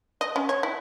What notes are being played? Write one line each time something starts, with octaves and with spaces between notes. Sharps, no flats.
D#5
C#4
C#5
E4